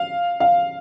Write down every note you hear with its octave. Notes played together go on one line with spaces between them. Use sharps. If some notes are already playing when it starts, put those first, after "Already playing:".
Already playing: F5
F5